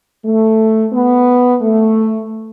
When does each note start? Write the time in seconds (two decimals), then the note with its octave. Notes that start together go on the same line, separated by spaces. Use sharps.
0.24 A3
0.93 B3
1.61 A3